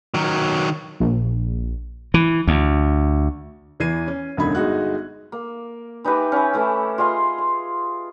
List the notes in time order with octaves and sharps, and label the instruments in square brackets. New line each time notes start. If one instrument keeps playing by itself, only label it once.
[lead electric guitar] D#3 F#3
[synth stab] A#1
[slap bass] E3
D2
[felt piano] E2 E3 G#6 C7 D#7
C#4
E1 F#2 D3 D#4 B5 G#6
G1 G#3 D#4 F#4 F#6
[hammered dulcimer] A#3
E3 D#4 G4 B4
C#4 E4
E3 A3 E4
F4 G#4 D#5 C6
C6